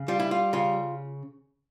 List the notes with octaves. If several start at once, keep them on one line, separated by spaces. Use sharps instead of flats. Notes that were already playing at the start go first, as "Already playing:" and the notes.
Already playing: C#3
G3 F4
E4
F4
C#3 F4